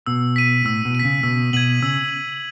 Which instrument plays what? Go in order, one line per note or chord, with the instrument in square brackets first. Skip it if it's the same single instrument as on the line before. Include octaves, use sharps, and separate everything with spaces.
[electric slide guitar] B2 [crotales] E6
[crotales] B6 D#7
[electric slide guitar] A2 [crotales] E6
[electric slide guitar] B2
[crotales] B6 D#7
[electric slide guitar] C#3
[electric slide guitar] B2 [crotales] E6
[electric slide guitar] B2 [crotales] G#6 D#7 F#7
[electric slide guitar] C#3 [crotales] E6